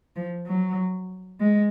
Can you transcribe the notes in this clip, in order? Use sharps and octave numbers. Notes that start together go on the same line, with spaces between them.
F3
F#3
G#3